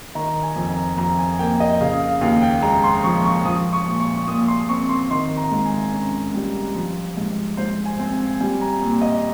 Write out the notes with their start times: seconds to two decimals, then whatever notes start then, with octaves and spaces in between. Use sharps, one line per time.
0.15 D#3 A#5
0.43 G#5
0.56 F2
0.71 A#5
0.97 F2 A#5
1.19 G#5
1.39 A#3 G5
1.60 D#5
1.81 C#3 F5
2.00 F5
2.21 D#2 F5
2.42 G5
2.62 G#3 A#5
2.84 C6
3.04 F3 C#6
3.25 C#6
3.45 F3 D#6
3.73 C#6
3.86 A#2
4.00 C#6
4.27 A#2 D#6
4.48 C6
4.69 C4 C#6
4.89 C6
5.11 D#3 C6
5.37 A#5
5.52 G#2
5.66 G#5
5.93 C#4
6.34 G3
6.75 F3
7.17 G#2
7.57 G#2 C5
7.85 G#5
7.99 C4
8.13 G#5
8.41 G3 G#5
8.61 A#5
8.82 A#2
9.02 D#5